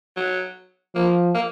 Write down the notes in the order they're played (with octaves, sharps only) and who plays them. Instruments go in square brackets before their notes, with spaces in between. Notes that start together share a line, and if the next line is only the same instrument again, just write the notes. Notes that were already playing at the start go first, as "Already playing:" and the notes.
[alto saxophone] F#3
[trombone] F3 [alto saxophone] A#3
[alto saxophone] A#3